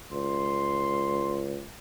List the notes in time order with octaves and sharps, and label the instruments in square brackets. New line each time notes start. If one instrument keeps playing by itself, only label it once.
[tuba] C#2 [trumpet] C6